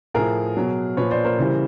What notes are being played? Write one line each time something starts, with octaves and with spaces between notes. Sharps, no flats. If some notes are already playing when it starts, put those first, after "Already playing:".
A2 F3 G#4 A#4
B2 F#3
A#2 F3 B4 C#5
C5 D5
A#4 C5
C#3 E3 G3